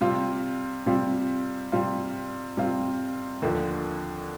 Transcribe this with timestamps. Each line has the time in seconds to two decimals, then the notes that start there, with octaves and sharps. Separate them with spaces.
0.01 C3 G3 C4 F4
0.86 C3 G3 C4 F4
1.72 C3 G3 C4 F4
2.57 C3 G3 C4 F4
3.42 D#2 D3 F3